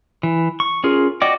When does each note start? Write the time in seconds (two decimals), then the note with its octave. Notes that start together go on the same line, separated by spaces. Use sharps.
0.23 E3
0.60 C#6
0.84 C#4 F4 G#4 A#4
1.22 F#4 D5 D#5 G5 D6